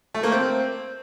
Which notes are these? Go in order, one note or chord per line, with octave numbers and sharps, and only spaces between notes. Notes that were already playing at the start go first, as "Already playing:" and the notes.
A3
A#3
C4